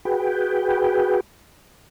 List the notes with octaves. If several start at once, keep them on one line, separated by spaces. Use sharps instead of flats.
F#4 G#4 B4 G5